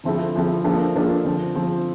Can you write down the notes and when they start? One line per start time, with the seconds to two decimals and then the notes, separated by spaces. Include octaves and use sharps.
0.04 D3 F3 C4 E4 A4
0.34 D3 F3 C4 E4 A4
0.64 F3 A#3 D4 A4
0.95 F3 A#3 D4 A4
1.25 D3 F3 C4
1.55 D3 F3 C4